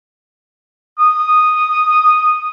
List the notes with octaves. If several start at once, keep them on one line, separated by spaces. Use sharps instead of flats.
D#6